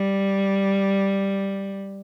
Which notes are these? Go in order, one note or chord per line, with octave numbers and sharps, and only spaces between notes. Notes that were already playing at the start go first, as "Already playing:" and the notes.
Already playing: G3